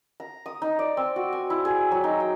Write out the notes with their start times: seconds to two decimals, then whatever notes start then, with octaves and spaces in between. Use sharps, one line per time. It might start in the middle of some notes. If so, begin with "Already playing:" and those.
0.20 A#5
0.46 D#6
0.62 D#4
0.79 D5
0.97 C4
1.16 F#4
1.33 G#5
1.50 E4
1.65 G#4
1.92 F#3
2.04 D#4
2.20 G5